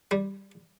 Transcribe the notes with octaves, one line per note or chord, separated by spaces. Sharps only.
G3